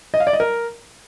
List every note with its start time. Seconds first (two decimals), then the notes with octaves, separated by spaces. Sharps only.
0.14 D#5
0.20 F5
0.27 D5
0.33 D#5
0.40 A#4